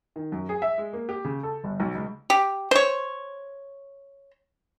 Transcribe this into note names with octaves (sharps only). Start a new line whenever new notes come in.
D#3
F#2
G#4
E5
G#3
A#3
G4
C#3
A4
G1
B1
C#2
G4
C5 C#5